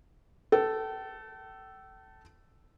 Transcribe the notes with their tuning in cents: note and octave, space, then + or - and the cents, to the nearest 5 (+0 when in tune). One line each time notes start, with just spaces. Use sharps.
A4 +0 G5 -40